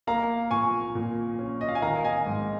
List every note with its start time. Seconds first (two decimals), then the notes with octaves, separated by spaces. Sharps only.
0.07 A#3 F5 A#5
0.51 A#2 G#5 C#6
0.95 A#2
1.39 C#4
1.61 D#5
1.69 F5
1.75 G#5
1.82 D#3 F5 A#5
2.04 D#5 G#5
2.26 G#2